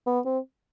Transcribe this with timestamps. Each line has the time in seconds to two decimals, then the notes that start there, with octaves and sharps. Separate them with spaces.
0.07 B3
0.25 C4